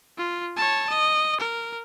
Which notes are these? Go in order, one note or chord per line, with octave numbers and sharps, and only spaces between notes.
F4
C#5 A5
D#5
A#4